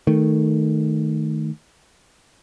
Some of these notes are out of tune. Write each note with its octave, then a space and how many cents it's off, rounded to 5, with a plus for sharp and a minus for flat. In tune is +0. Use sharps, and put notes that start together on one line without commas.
D#3 +0 A3 +0